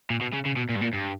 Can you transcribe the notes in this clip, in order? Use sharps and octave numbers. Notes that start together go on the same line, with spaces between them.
A#2
B2
C#3
C#3
B2
A#2
G2
A#2
G2